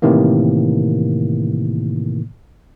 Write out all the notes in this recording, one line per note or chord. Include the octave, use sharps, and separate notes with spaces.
A2 C3 D#3 E3 A#3